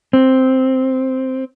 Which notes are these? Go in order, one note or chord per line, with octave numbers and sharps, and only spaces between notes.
C4